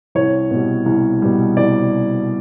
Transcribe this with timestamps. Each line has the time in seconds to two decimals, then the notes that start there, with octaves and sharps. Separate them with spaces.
0.15 C2 C#5
0.51 B2 G3
0.86 C2
1.22 B2 G3
1.57 C2 D5